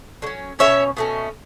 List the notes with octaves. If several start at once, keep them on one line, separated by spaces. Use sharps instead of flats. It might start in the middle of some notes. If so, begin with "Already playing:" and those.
D3 F#3 C#4
B2 A3 C#4 C#5 E5
B2 A3 C#4